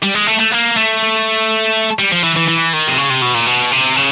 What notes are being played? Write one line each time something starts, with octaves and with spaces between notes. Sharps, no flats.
G3
G#3
A3
A3
A#3
A3
G3
F3
E3
E3
E3
D#3
C3
C#3
C3
B2
A#2
B2
C3
C#3